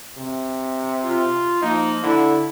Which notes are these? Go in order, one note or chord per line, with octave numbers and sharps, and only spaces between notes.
C3
F4
F3 A#3 D#4
D3 E4